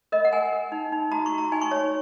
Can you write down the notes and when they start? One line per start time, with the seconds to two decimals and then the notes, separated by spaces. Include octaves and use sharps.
0.12 A#4 D#5
0.25 F#5
0.33 A#4 G#5
0.52 A#4
0.72 D#4
0.92 D#4
1.12 F#4 A#5
1.26 C#6
1.33 F#4
1.38 A#5
1.52 D#4 G#5
1.61 C#6
1.71 C#5